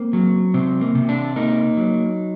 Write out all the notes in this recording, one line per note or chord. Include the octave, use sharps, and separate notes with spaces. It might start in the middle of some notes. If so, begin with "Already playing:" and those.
Already playing: A#3 C4
F#3
C3 C4
A#3
C3
D4
A#3 D#4
F#3